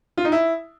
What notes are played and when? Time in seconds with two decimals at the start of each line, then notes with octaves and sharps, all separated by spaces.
0.17 F4
0.25 D#4
0.32 E4